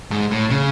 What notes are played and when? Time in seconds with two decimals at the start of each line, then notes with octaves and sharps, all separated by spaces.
0.11 G#2
0.31 A2
0.50 C#3